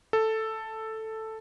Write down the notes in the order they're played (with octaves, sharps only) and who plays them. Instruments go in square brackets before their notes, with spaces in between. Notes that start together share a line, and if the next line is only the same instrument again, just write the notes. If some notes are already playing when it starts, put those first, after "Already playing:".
[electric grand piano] A4